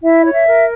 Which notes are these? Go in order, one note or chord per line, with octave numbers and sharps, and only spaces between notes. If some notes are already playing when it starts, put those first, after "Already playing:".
E4 E5
C#5
E5
A#4